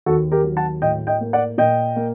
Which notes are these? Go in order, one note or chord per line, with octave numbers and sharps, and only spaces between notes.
D#2 F#4 A4
G4 A#4
F#3
F#5 A5
A2 D#5 G5
D#5 G5
A#3
D5 F#5
A#2 D#5 G5
A#3